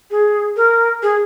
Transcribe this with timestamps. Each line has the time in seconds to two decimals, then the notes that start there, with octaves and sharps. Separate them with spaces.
0.11 G#4
0.57 A#4
1.03 G#4